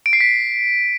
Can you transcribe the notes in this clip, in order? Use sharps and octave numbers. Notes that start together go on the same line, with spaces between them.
D7
C7
B6